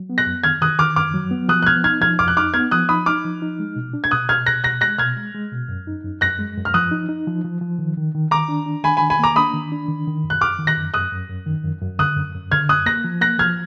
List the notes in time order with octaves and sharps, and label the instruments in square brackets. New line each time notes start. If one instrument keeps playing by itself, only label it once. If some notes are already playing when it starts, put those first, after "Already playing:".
Already playing: [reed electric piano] F#3
B3
[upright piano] F#6 A#6
[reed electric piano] F#2
[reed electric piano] D#3 [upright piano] F6 G#6
[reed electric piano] D#3 [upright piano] D#6 F#6
[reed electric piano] D#3 [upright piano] D6 F6
[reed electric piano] F#2 [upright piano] D6 F6
[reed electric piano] F#3
B3
[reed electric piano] F3 [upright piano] D#6 F#6
[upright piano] F#6
[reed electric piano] B3 [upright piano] F6 G#6
[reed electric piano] D#4 [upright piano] F6 G#6
[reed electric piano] F3 [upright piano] F6 G#6
[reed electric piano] F2 [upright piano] D6 F6
[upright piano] F#6
[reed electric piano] D#4 [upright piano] D6 F6
[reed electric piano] B3 [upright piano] F6 G#6
[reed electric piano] F3 [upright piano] D#6 F#6
[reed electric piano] D#4 [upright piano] B5 D#6
[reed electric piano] D#4 [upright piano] D6 F6
[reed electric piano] F3
D#4
G#3
B2
D4
[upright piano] G#6
[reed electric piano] B2 [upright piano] D#6 F#6
[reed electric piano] B2 [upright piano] F6 G#6
[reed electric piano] B2 [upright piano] F#6 A#6
[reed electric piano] B2 [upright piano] F#6 A#6
[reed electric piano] G#3 [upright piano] F#6 A#6
[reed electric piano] B2 [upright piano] F6 G#6
[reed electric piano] G#3
G#3
B2
F#2
D#4
F#2
[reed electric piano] F#2 [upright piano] F#6 A#6
[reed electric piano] G#3
F#2
[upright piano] F6
[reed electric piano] F3 [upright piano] D#6 F#6
[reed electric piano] D#4
D#4
F3
F3
F3
D#3
D#3
D#3
[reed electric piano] D#3 [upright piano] A#5 D6
[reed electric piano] D4
D4
[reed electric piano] D#3 [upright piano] G#5 B5
[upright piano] G#5 B5
[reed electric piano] D#3
[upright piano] G#5 B5
[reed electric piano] A#3 [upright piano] A#5 D6
[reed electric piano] D4 [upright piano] B5 D#6
[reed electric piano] D#3
D4
D#3
D#3
F#2
[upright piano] F#6
[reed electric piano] F#2 [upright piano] D6 F6
[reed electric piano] D#3
[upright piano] F#6 A#6
[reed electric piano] F#2
[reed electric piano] F#2 [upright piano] D#6 F#6
[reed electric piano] F#2
F#2
D#3
F#2
F#2
[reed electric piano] D3 [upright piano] D#6 F#6
[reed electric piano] F#2
F#2
[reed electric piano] D3 [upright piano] F6 G#6
[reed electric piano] F#2 [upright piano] D#6 F#6
[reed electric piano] A#3 [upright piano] F#6 A#6
[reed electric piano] F3
[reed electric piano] A#3 [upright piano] F#6 A#6
[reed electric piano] F3 [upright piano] F6 G#6